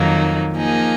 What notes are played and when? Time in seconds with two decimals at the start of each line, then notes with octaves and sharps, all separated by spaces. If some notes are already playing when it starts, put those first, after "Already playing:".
Already playing: F2 D#3 F#3 A#3 D#4
0.53 F3 A#3 D#4 G#4